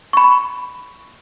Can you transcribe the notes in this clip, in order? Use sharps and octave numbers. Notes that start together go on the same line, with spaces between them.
B5 C#6